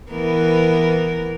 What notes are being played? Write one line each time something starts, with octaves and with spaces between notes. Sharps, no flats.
E3 B3 A#4